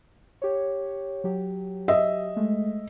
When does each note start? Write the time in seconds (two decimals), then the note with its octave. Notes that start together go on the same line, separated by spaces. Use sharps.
0.42 G4 C#5
1.24 F#3 G4
1.88 D#5 E5
2.36 G#3 A3